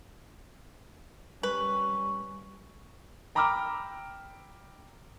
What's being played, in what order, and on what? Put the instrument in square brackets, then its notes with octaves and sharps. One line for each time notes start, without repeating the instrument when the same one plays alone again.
[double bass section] G3 [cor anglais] C#4 [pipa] B4
[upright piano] G5 A#5 B5 D6 E6 F6